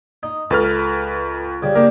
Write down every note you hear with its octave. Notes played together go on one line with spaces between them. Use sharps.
D#4
C#2 A4 B4 F6
C#3 G3
A#3 D4 G4 A#4